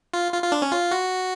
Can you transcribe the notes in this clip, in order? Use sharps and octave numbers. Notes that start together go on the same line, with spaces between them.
F4
F4
F4
D4
C#4
F4
F#4